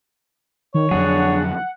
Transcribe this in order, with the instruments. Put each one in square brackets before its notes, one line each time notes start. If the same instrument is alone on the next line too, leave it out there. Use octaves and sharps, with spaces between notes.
[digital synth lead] D#3 [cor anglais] C#5
[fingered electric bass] F2 D3 F#3 [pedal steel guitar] D4 G#4 [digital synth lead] F#5